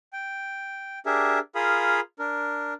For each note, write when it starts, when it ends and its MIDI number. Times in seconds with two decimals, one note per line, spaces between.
0.13 0.99 79
1.06 1.39 62
1.06 1.39 67
1.06 1.39 68
1.06 1.39 70
1.06 1.39 76
1.55 2.00 65
1.55 2.00 68
1.55 2.00 70
1.55 2.00 77
1.55 2.00 83
1.55 2.00 87
2.19 2.74 62
2.19 2.74 70